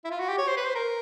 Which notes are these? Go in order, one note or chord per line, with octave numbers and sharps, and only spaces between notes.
E4
F4
F#4
G4
C#5
C5
B4
C5
A#4